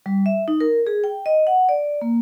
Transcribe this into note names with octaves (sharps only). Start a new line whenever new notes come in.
G3
E5
D#4
A#4
G#4
G5
D#5
F#5
D5
A#3